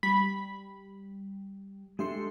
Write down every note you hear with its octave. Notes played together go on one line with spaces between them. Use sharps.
G3 B5
G#3 D4 G4 A4 E5 C6